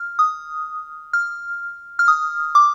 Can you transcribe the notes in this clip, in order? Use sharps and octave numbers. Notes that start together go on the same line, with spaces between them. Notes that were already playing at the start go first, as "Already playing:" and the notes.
Already playing: F6
D#6
F6
F6
D#6
D6